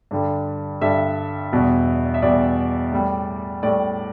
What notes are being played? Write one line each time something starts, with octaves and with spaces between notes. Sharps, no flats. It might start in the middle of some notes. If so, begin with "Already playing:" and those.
G2 D3 G3
G2 D3 G3 E5
E2 B2 G3
E5
E2 B2 G3 D5
A2 G3
A2 G3 D5